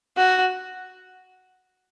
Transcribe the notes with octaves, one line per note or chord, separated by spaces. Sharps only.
F#4